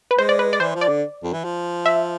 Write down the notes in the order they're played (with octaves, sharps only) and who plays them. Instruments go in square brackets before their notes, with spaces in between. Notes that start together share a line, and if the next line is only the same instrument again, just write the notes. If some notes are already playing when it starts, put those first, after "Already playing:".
[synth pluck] B4
[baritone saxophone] G#3 [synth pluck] C5
[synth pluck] D5
B4
D5
[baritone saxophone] E3 [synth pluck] C5
[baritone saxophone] F3
[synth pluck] D5
[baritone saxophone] D3
F2
E3
F3
[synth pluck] E5